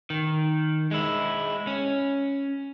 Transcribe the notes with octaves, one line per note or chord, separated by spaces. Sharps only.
D#3
G#3 E4
C#4